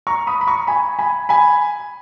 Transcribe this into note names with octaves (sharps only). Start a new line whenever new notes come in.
A#5 C#6
B5 D#6
B5
A#5 C#6
G#5 B5
G#5 B5
G#5 B5